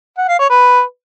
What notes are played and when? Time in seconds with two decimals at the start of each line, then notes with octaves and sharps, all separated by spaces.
0.18 F#5
0.28 F5
0.39 C#5
0.50 B4